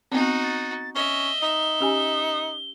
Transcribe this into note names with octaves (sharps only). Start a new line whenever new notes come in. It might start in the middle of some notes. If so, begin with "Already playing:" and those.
B3 C4 D#4 F#4
A6
C#4 D#5 E5 G7
D#4 E5
C#4 G4 G#5